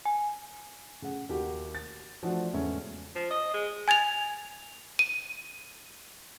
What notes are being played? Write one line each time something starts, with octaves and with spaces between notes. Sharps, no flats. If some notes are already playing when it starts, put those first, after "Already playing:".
G#5
C#3 G#4 F#5
D#2 F#4 G4
A6
E3 F3 A3 D4 F#4
E2 G#2 C#3 A3 C#4
F3
D#5
G#3
G#5 G#6 A6 F7
D#7